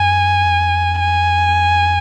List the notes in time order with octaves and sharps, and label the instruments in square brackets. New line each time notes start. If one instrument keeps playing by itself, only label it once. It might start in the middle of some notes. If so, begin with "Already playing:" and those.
Already playing: [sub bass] F#2 [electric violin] G#5
[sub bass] F2
[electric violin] G#5